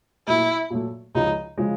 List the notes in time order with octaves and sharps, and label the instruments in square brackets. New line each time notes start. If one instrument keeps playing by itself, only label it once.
[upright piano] A#2 F#3 A3 [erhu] E4
[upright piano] A#2 F#3 A3
[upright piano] C#2 C#3 F3 G#3 [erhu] D#4
[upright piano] C#3 F3 G#3